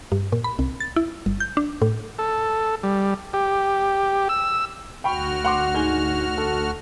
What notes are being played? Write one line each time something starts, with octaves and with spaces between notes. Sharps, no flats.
G2
A#2
B5
C2
A6
E4
G1
G6
D4
A2
A4
G3
G4
E6
D2 F#4 G5 B5 C#6 F6
F#5 C6 D6
G#2 G#5 G7
A4